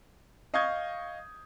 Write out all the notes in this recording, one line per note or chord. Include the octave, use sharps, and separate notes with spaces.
D#5 F5 C#6 D#6 G6 G#6